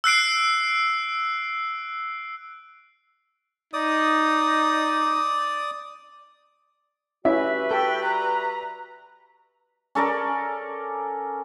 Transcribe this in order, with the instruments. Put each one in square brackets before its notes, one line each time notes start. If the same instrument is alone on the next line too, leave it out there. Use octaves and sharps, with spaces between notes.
[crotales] E6 F#6 C7 D7
[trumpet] D#4 [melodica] D5 D#6
[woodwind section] G3 F#4 B4 [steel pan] C#4 E4 [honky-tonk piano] E5
[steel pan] A4 [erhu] G5
[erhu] A#5
[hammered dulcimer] C#4 A4 A#4 D5